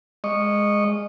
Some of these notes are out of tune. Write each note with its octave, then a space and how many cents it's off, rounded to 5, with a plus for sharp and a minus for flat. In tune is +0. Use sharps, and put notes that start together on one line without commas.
G#3 +0 D#5 -20 C#6 +0